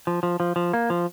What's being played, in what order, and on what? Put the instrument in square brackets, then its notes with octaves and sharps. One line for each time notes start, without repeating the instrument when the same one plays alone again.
[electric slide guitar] F3
F3
F3
F3
A#3
F3